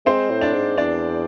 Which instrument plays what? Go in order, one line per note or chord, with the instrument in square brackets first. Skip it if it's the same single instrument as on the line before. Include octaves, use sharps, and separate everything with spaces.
[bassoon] G#3 [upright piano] C4 C5
[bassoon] A2
[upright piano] D4 D5
[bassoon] G#2
[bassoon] E2 [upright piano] D4 D5